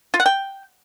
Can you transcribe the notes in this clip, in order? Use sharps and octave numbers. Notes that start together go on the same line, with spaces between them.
F4
F#5
G5